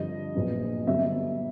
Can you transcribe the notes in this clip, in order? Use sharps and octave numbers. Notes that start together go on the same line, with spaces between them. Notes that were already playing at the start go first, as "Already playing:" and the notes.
Already playing: G2 D3 F3 D#5
A#1 A#2 F#3 B3
G1 G2 D3 F#3 E5